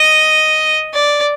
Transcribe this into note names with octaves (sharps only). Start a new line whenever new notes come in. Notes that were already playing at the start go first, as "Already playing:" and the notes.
Already playing: D#5
D5